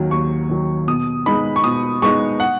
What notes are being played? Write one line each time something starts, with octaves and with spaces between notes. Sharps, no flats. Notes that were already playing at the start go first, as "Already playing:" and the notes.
Already playing: D#2 D#3 F#3
D#2 C#6
D#3 F#3
B2 D#6
G#3 B3 D#4 B5
C#6
B2 D#6
G#3 B3 D#4 C#6
F#5